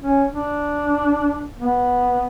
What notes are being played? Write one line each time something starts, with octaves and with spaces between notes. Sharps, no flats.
C#4
D4
B3